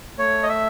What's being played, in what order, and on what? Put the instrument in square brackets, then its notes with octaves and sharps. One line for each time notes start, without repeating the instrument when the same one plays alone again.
[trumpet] A3 [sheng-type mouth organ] C#5
[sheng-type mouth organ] D#5
E5